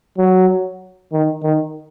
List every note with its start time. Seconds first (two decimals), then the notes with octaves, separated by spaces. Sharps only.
0.18 F#3
1.13 D#3
1.43 D#3